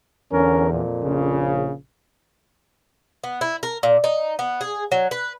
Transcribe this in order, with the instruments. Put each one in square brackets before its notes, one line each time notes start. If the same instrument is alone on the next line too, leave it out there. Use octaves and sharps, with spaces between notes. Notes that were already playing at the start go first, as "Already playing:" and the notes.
[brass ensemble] E2 [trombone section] D3 C#4 A#4
[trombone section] F2 A#2
[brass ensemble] A#1 C#3
[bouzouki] B3
E4
A#4
A#2
D#4
B3
G#4
F#3
B4